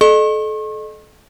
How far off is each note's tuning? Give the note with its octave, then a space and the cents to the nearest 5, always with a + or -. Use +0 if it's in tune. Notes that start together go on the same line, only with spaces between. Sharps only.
A4 -30 D#5 -35 C#6 -40